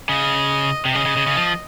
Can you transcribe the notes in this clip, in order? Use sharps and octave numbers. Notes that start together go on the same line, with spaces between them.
C#3 D#5
C3
C#3 D#5
C#3
C#3
C#3
F3